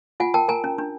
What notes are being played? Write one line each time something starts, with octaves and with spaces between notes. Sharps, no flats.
F4 F#5 G#5
A#4 G5 A5
A#4 G#5 A#5
C#4
D4